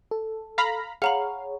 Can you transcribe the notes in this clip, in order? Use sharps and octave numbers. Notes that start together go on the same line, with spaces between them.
A4
F5 A#5 B5
G#4 C#5 F5 F#5 A#5 B5